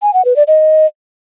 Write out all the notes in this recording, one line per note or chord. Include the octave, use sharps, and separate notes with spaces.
G#5
F#5
B4
D5
D#5